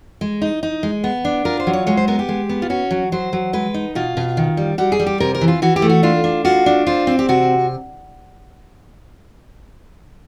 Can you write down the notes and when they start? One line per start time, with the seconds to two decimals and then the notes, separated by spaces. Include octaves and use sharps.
0.21 G#3
0.42 D#4
0.63 D#4
0.83 G#3
1.04 B3
1.25 D4
1.45 F4 A#4
1.60 C5
1.67 F#3
1.73 C#5
1.87 G#3 C#5
1.97 C5
2.08 B3 A#4
2.19 G4
2.29 G#3
2.49 B3
2.62 F4
2.70 C#4 F#4
2.91 F#3
3.12 F#3 C5
3.33 F#3
3.53 G#3 B4
3.74 D#4
3.95 B2 F4
4.17 B2
4.37 D#3
4.57 G3
4.78 G3 F#4
4.92 G#4
5.00 G3
5.07 G4
5.20 C3 A#4
5.35 A#4
5.41 E3
5.48 F4
5.62 E3 F#4
5.76 G4
5.82 A3
5.90 F#4
6.03 D4 F4
6.24 D4
6.45 F4 F#4
6.66 D4
6.87 C4 F4
7.07 C4
7.19 G4
7.29 C3 F#4